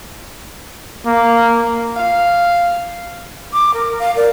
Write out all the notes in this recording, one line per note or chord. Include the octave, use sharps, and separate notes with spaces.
A#3
F5
D6
A#4
F5
A#4 D5